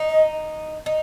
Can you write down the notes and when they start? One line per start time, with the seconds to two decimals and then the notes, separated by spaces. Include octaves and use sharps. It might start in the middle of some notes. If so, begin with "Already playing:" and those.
Already playing: D#4
0.09 D#5
0.86 D#4